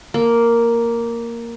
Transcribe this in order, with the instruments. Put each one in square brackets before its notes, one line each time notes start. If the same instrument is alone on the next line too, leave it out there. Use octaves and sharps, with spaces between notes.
[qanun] A#3